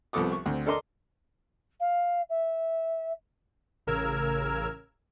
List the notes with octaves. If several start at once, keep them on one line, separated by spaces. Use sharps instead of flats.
C2 F3 B3 A4 D6 D#6
C#6
D2 C4
D4 A4 A#4 D#5 C6 D6
F5
E5
A1 C#3 A#4 E6 F6 G#6